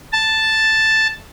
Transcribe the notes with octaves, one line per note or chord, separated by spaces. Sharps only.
A5